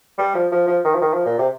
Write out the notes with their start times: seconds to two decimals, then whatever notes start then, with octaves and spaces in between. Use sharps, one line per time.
0.18 G3
0.34 F3
0.51 F3
0.67 F3
0.84 D#3
0.95 F3
1.01 D#3
1.13 F3
1.26 A#2
1.38 C3